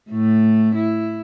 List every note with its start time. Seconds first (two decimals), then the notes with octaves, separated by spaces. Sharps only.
0.11 A2 A3
0.75 E4